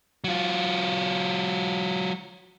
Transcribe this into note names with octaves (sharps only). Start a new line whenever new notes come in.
F#3 F4